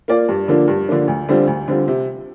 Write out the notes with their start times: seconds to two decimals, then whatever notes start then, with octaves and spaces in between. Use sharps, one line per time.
0.08 A#3 F4 D5
0.29 G2
0.48 D3 F3 A#3 D4
0.68 G2
0.88 D3 F3 A#3 D4
1.08 D2
1.29 D3 G3 C4 F4
1.47 D2
1.68 D3 G3 C4 F4
1.88 C3